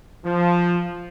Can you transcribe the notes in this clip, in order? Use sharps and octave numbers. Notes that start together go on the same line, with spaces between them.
F3